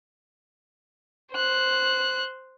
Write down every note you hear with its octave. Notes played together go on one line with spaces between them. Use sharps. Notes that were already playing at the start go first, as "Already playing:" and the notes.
C5 F#6